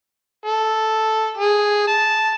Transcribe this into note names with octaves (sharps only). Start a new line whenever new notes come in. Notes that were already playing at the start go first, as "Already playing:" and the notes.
A4
G#4
A5